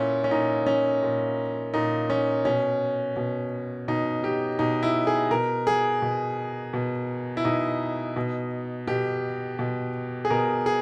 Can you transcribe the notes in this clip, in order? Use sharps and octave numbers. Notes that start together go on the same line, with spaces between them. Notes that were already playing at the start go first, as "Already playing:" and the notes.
Already playing: A#2 C#4 E4
C#4
A#2 D#4
C#4
A#2
A#2 D#4
C#4
B2 C#4
B2
B2 D#4
G4
B2 D#4
E4
G#4
B2 A#4
G#4
B2
B2
E4
B2 D#4
B2
B2 G4
B2
G#4
B2 A#4
G#4